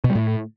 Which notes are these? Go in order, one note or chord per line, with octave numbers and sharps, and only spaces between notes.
B2
G3
A2